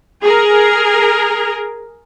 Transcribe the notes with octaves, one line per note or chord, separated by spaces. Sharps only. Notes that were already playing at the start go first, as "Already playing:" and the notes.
G#4 A#4